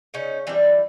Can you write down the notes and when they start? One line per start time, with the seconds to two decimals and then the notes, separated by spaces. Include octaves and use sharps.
0.14 C#3 C#4 D#4
0.47 E3 G3 C4 D4